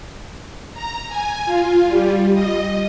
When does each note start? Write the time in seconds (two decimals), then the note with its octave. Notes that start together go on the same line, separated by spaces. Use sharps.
0.74 A#5
1.08 G#5
1.45 F4
1.87 G3
2.34 D#5